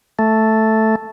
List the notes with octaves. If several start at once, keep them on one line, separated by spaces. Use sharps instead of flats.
A3